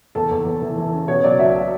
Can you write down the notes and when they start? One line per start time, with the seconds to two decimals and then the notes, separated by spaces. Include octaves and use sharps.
0.15 E2 A4
0.31 E2
0.46 E2
0.62 E3
0.78 E3
0.93 C#3
1.08 B2 C#5
1.23 F#3 D5
1.39 B1 E5